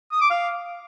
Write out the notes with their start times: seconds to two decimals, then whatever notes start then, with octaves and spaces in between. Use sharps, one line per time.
0.12 D#6
0.21 D6
0.30 F5